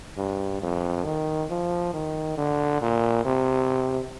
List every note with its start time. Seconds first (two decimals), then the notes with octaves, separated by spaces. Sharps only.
0.17 G2
0.62 F2
1.05 D#3
1.50 F3
1.93 D#3
2.37 D3
2.81 A#2
3.25 C3